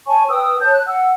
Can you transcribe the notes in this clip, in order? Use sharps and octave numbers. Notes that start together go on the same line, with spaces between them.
C#5 G#5 A5 C#6
B4 G5 D#6 E6
C#5 A5 G6
F#6
F#5 E6